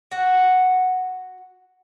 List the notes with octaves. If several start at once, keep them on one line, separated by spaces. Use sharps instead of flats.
F#4 F#5